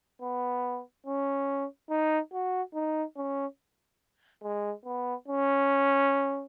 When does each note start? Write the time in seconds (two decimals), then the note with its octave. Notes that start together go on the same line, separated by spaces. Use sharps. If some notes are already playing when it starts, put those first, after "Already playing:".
0.22 B3
1.06 C#4
1.90 D#4
2.33 F#4
2.74 D#4
3.17 C#4
4.43 G#3
4.85 B3
5.28 C#4